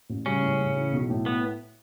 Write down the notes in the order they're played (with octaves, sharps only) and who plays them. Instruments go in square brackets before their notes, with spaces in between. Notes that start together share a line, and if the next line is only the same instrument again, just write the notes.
[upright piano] A1
[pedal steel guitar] C#3 C#4 [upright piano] G3
[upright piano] A2
A2
E3
B1
A2
[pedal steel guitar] B3